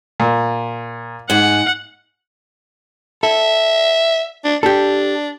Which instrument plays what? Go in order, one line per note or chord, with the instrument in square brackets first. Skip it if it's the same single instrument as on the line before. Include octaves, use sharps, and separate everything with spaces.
[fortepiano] A#2
[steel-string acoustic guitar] G#2 G#4 [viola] F#5
[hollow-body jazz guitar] A4 [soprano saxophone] E5
[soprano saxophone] D4
[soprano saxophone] D4 [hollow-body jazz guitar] G4 A4